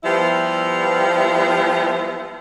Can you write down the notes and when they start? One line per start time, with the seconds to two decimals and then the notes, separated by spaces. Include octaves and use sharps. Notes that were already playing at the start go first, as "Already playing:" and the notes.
0.04 F3 G3 B3 E4 G4